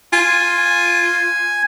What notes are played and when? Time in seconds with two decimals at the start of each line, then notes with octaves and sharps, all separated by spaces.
0.13 F4 G#5